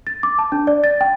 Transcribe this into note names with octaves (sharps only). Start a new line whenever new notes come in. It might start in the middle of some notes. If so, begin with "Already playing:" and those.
A6
D6
A5
D4
D5
A6
G5